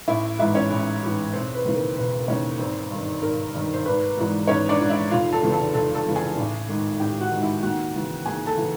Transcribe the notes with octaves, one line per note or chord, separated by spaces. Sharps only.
A1 E4 E5
G#2 E3 E4 E5
C#4 C#5
A1
G#2 E3
E1 C4 C5
B4
D#2 C#3 E3
A#4
E1 B4
D#2 C#3 E3 C#4 C#5
G#1 C4 C5
G2 D#3
G#1 A#4
G2 D#3
C5
G#1 B4
G#2 E3
G#1 C#4 C#5
D4 D5
G#2 E3
E4 E5
F1 F4 F5
A4 A5
E2 C#3 E3
A4 A5
F1 A4 A5
A4 A5
E2 C#3 E3
G#4 G#5
A1
G#2 D#3
A1 G4 G5
F#4 F#5
G#2 D#3
E4 E5
D#2 F#4 F#5
C#3 E3
D#2 G#4 G#5
A4 A5
C#3 E3